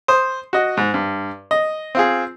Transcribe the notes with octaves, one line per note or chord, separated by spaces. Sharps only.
C5 D#6
F#4 D#5
G#2
G2
D#5
C4 F4 G#4